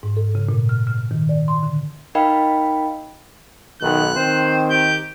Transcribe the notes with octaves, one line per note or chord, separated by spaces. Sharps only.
G#2
A4
C#3
A#2
F6
F6
D#3
D5
C6
D3
D#4 A#4 D#5 F5 G5 B5
B1 D#3 F#6
D#3 C4 C5
G4 G6